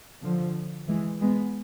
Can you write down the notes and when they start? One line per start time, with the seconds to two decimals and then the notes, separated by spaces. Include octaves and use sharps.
0.22 D3 F3
0.88 E3 G#3
1.21 G#3 B3